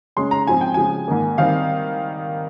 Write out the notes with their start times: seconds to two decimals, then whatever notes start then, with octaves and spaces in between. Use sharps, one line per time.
0.16 C#3 G#3 C#4 C6
0.31 A#5
0.47 G#2 F3 C4 G#5
0.61 G5
0.74 C#3 F3 G#3 G#5
1.08 G#2 D#3 A#3
1.38 D#3 G3 C4 F5